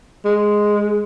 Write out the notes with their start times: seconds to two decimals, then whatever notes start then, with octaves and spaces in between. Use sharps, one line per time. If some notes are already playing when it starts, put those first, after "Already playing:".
0.25 G#3